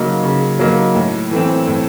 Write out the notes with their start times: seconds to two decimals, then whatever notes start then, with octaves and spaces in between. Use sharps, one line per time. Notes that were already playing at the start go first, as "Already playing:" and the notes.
Already playing: C#3 F#3 A#3 D#4
0.24 C#3
0.59 F#3 A#3 D#4
0.95 A2
1.31 E3 A3 C4
1.68 A2